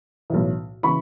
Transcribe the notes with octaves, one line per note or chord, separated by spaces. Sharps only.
B1 A2 E3
C#3 E3 B5 C#6